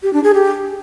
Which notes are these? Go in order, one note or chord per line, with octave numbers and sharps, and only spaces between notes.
G4
D4
G#4
G4